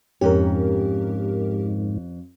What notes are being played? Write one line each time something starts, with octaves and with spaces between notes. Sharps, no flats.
F2 G#2 C#4 G4 A#4